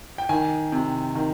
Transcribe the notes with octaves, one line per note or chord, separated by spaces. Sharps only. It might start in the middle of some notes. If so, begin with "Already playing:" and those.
G5
D#3 G#5
C3
D#3